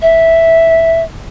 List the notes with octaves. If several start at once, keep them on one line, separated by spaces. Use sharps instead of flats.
E5